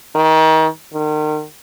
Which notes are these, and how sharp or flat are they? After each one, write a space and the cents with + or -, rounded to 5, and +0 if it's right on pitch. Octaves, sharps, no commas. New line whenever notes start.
D#3 +30
D#3 -35